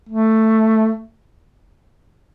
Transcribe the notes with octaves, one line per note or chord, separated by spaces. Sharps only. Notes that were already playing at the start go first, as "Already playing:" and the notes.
A3